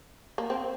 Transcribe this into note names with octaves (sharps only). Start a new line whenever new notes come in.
A#3
C4